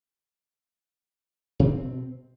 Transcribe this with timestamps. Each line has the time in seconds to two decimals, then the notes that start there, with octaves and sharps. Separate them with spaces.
1.59 B2
1.63 D4
1.67 C4